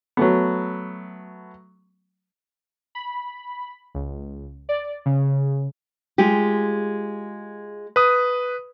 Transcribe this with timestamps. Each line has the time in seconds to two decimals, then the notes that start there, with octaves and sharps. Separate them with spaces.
0.17 F#3 A3 B3
2.95 B5
3.94 C#2
4.69 D5
5.06 C#3
6.18 G#3 F4 G4
7.96 B4 D#6